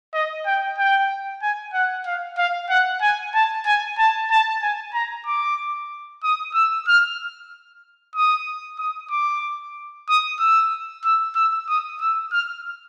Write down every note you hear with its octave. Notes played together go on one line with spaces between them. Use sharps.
D#5
G5
G5
G#5
F#5
F5
F5
F#5
G#5
A5
G#5
A5
A5
G#5
A#5
D6
D#6
E6
F6
D#6
D#6
D6
D#6
E6
E6
E6
D#6
E6
F6